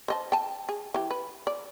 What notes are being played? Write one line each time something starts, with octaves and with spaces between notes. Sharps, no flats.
C5 D#5 A5
G5 A5
G#4
E3 G4
B4
D5